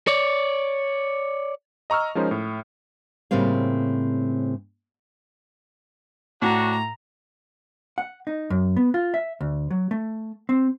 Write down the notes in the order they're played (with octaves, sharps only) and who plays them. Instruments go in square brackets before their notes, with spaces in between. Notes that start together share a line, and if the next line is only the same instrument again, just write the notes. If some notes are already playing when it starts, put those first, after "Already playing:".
[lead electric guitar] C#5 D5
[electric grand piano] D#5 A#5 C#6 E6 F6
F3 G#3 C#4 D#4 A#4 C5
A2
[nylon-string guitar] A2 C#3 G3 A#3 C4 F5
[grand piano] A2 [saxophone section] F#3 D4 F#4 [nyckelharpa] A#5
[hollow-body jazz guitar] F#5
D#4
F#2
B3
F4
E5
D2
F#3
A3
C4